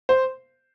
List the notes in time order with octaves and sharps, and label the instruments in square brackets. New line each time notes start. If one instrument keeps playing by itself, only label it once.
[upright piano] C5